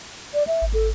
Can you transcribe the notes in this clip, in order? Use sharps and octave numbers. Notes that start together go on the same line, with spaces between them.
D5
E5
G#1
A4